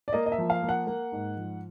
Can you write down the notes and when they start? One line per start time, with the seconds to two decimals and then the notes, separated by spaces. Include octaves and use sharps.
0.08 D5
0.13 A#3 D#5
0.26 D#5
0.32 E5
0.38 F3
0.50 F5
0.62 A#3
0.69 F#5
0.87 A#3
1.12 G#2
1.37 F3